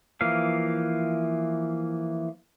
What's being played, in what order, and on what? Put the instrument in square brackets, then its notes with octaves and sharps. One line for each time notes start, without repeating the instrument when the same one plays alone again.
[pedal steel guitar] E3 F3 A#3 F5